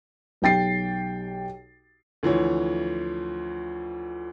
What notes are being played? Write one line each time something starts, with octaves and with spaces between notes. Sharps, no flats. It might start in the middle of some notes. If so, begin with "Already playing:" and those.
B1 G4 G5 A6 C7
D2 E3 F3 C#5